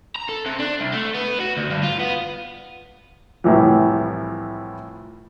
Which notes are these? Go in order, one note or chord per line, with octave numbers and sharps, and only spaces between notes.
A#5
A4
C3
D4
C2
A3
B3
F#4
D2
G2
F4
B3
C2 A2 E3 F3